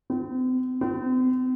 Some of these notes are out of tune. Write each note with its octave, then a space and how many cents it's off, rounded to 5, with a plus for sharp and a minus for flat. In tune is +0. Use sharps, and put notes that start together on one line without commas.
C4 -40
C4 -40